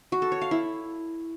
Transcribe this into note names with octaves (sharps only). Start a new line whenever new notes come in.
F#4
A4
C#5
F5
E4